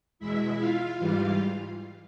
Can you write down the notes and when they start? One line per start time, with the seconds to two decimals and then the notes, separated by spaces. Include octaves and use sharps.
0.19 E2 B2 G#3 E4 E5
0.59 F4 F5
0.98 G#2 E3 G3 F4 F5